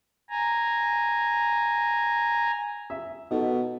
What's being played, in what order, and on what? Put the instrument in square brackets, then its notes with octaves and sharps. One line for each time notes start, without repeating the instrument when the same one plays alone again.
[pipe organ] G#5 A#5
[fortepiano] E5
[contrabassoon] B2 [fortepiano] D#4 A4